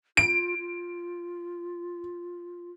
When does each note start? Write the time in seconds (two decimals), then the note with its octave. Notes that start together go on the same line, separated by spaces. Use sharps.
0.17 F4 D7
0.58 F4